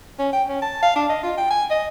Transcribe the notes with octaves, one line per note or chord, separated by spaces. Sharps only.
C#4
G5
C#4
A5
F5
D4
D#5
F4
G5
G#5
D#5